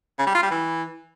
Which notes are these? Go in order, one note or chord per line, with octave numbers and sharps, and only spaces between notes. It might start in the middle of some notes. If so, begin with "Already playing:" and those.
C#3
G3
F4
G3
E3